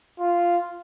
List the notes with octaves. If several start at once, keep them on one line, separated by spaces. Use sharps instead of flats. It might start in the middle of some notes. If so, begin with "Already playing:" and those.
F4